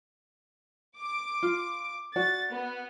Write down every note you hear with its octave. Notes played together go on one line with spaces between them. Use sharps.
D6
F4
F#4 D5 F#5 A6
B3